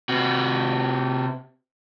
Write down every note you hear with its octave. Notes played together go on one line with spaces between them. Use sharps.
C3 F#4